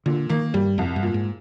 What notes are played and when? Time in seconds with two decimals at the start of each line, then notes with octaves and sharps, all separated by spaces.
0.06 A#2 D3
0.29 D#3 A#3
0.54 G2 G3
0.78 C2 F2
0.96 G2
1.03 A#2
1.14 G#2